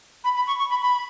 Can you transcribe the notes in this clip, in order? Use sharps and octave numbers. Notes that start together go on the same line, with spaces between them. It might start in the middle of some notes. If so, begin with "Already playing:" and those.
B5
B5
C#6
C#6
B5
B5